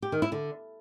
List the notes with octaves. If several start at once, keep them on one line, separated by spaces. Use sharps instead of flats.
G4
D#3
E4
D3